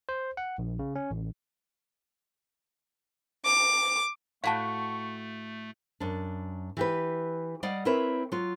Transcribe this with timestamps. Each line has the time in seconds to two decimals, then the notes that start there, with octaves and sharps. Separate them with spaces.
0.09 C5
0.37 F#5
0.58 A#1
0.79 C#3
0.96 C#4
1.11 A1
3.45 D6
4.44 A2 A3 F#4 F5 G5 A5 C#6
6.00 F#2 D4
6.77 E3 G4 B4
7.63 G3 D5 D#5 F5 F#5
7.85 C4 E4 A#4 B4 C#5 E5
8.32 F#3 F4